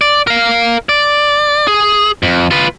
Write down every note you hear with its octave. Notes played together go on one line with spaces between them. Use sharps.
D5
A#4 F5
D5
G#4
F2
F4 B4